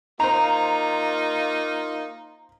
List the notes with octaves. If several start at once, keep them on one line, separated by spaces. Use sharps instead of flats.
A#3 D#4 F4 C5 A#5